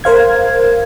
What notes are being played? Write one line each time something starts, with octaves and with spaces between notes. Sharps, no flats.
A#4 C5 F5 G#6